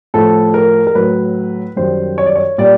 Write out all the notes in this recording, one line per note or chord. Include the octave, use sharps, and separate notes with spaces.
A2 F3 A4
A#4
A#4
A2 F#3 B4
F#2 D#3 G3 C5
C#5
D5
C#5
A#2 G3 D5